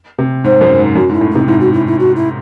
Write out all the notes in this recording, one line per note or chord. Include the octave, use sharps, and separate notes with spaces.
C3
G#2 C5
F#2
G#2
F#2 F#4
G#2
E4
A2
C3 D#4
G#2 E4
F#4
E4
E4
F#4
E4